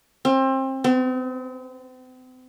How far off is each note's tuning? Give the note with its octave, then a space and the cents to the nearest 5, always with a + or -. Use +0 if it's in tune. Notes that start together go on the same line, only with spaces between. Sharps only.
C4 +30
C4 -40